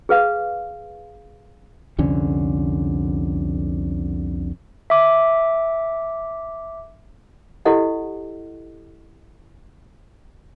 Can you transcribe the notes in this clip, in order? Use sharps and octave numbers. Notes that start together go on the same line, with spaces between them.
G#4 B4 F5
C2 F2 D3 C#4
E5 D6
E4 G4 A4 D#5 F#5